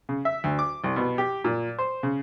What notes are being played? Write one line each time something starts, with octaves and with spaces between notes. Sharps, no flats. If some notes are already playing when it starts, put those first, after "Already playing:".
C#3
E5
D2
D6
C2
B2
G4
A#2
C5
C#3